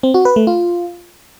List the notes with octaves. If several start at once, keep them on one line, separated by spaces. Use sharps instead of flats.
C4
F#4
B4
A3
F4